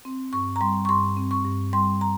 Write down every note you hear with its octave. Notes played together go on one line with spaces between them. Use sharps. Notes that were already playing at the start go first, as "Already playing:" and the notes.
C4
G2 C#6
A#5
G3 C6
C#6
G2 C6
C4
C#6
G2
G3 C6
A#5